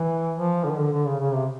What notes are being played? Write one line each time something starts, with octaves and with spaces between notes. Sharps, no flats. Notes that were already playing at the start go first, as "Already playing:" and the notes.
Already playing: E3
F3
D3
D#3
D3
D3
C#3
C#3
C3